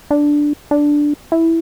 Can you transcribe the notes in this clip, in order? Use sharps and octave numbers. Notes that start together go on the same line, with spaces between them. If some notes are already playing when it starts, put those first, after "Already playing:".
D4
D4
E4